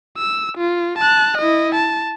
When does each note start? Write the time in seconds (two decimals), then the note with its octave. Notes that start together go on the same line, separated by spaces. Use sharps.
0.18 E6
0.58 F4
0.98 A5 F#6
1.38 E4 D#5
1.75 A5